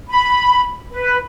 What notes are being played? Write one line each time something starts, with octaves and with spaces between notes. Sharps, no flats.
B5
B4